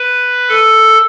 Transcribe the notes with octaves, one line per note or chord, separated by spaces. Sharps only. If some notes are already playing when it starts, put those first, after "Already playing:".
Already playing: B4
A4